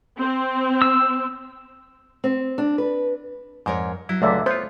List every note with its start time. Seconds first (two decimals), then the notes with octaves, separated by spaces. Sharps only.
0.20 C4
0.82 E6
2.24 C4
2.58 D4
2.78 B4
3.66 F2 G#2 A#4 C#5
4.09 F#3 E4
4.22 C#2 A#2 D3 A3 D5 E5
4.46 B3 F4 C5 C#5